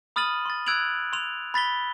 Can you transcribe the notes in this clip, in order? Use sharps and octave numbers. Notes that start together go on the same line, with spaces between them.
B5 D#6 F6 A6 D#7 F#7
C6 A6
E6 F#6 G#6 D7 F7 F#7
C6 F7
B5 A6 B6 G7